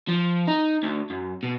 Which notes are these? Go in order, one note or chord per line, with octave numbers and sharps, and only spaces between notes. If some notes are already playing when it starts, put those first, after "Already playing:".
F3
D#4
D2
F#2
B2